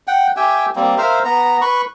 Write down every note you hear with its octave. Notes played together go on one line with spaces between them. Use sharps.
F#5 G5
G4 E5 G5 G#5
G3 A#3 C4
A#4 C5 E5 F5
B3 A#5
B4 B5 C#6